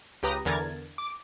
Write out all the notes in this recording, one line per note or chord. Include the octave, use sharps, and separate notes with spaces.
C#2 G4 B4 A#5 D#6 A#6
E2 D3 E3 A#4 G#6 A6
D6